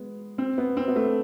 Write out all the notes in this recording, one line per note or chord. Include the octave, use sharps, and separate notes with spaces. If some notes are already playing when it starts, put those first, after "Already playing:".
Already playing: G#3 B3
C4
B3
C4
B3
A3